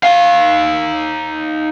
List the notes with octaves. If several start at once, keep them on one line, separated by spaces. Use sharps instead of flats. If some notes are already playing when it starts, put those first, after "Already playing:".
D#4 F5